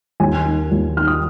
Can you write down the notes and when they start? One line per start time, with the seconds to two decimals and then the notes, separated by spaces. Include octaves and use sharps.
0.20 D#2 G#5
0.46 D#3
0.71 D#2
0.97 D#3 F6
1.07 D#6